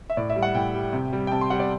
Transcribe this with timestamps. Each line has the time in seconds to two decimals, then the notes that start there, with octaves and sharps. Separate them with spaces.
0.10 E5
0.17 A2 D5
0.30 E5
0.36 G3
0.43 F#5
0.55 A2 G5
0.74 G3
0.93 C3
1.13 G3
1.27 G5
1.31 C3 A5
1.41 C6
1.50 G3 F#5
1.60 D5